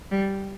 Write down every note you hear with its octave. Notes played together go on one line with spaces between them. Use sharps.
G3